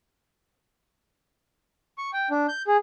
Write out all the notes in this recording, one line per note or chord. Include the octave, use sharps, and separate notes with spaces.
C#6
G5
D4
G6
G#4